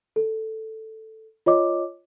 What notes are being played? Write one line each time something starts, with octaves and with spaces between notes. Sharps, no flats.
A4
F4 C#5 D#5 D6